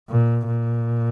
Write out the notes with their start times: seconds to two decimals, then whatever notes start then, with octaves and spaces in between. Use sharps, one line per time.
0.10 A#2
0.46 A#2